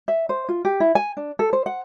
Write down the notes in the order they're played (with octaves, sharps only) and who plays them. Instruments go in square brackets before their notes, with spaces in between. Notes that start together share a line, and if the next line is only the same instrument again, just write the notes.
[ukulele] E5
C5
F4
G4
E4
G#5
D4
A4
C5
F#5